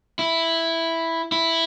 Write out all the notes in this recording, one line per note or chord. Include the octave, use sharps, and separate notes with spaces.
E4
E4